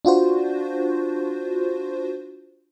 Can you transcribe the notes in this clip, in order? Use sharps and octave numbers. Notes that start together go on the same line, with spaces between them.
D4 F4 F#4 C5